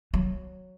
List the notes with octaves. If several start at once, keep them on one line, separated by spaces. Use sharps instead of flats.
F#3